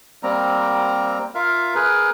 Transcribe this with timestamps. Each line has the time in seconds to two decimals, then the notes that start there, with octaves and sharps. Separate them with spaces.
0.23 G3 A#3 C4 A#5
1.35 F4 A#4 E5 F5
1.75 G#4 A#4 B4